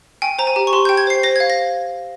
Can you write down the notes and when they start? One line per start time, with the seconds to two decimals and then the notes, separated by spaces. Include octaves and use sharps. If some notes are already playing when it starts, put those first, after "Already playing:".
0.22 G5 G#5
0.39 C5 A#5
0.47 G#5
0.56 G4
0.67 C#6
0.73 G4 C6
0.85 G6
0.89 G5
0.97 G#6
1.07 C5 C7
1.23 C5 A#6
1.36 G#6
1.40 F5
1.50 A#6